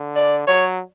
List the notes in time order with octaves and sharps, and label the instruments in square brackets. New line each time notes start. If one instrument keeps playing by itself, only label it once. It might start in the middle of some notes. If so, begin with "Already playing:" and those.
Already playing: [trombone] D3
[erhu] D5
[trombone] F#3 [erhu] C#5